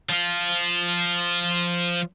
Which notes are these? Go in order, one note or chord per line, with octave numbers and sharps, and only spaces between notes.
F3 F4